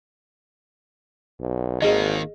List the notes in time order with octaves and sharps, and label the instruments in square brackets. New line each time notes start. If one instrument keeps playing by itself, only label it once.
[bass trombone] B1
[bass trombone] G#1 [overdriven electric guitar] D#3 A#3 [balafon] G#4 D#5